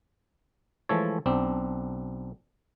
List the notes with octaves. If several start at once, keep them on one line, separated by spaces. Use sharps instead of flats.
E3 F3 G#3 A3 A4 C#5
B1 C4 D4